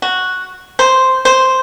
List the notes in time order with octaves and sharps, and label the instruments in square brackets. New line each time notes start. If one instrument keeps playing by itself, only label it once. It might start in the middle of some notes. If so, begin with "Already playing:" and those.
[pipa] F#4
C5
C5